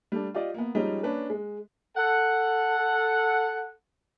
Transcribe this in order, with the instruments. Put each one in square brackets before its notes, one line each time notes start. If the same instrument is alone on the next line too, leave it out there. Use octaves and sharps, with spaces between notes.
[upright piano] G3 A3 D4
F4 G4 D5 D#5
A#3 B3
F3 G3 G#3 C#4 D#4
A#3 C#4 D4 B4
G#3
[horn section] A4 F#5